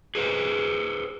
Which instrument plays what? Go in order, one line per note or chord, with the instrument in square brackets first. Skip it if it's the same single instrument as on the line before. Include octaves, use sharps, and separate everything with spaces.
[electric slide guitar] G#4 B4 C5 F#5